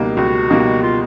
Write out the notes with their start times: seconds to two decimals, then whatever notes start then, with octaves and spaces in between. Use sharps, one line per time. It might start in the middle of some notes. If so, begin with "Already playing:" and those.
Already playing: C#2 B2 G3 A#3 D#4
0.17 C#2 F#4
0.50 B2 G3 A#3 D#4
0.83 F4